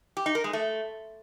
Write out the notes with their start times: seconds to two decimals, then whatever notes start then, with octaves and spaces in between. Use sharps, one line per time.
0.17 G4
0.26 D#4
0.35 A#4
0.44 G#3
0.53 A3